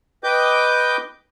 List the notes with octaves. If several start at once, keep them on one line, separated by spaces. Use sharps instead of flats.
B4 D#5 G5 D6 G6